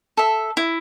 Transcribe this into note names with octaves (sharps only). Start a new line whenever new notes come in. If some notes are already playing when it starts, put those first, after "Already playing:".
A4 E5
E4